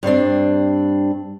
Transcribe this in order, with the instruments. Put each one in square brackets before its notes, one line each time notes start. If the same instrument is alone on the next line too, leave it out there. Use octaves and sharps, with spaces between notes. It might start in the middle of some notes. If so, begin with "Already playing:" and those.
[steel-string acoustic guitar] G2 G3 C4 D4